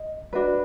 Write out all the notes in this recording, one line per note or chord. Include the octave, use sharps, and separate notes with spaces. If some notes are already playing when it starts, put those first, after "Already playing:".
Already playing: D#5
D4 F#4 B4